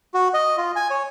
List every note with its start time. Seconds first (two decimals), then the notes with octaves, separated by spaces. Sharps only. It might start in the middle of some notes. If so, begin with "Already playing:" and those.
0.14 F#4
0.34 D#5
0.58 F4
0.76 G#5
0.90 C#5